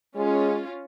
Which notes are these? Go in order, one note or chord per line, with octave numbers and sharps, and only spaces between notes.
G#3 C#4 F4